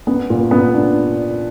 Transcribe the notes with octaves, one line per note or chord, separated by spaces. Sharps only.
B3
A#2
B3
D4